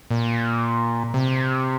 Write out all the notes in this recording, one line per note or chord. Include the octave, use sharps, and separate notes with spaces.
A#2
C3